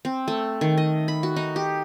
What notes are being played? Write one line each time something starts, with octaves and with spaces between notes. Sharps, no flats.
C4
A3
D#3
D#5
B5
F#4
D#4
G4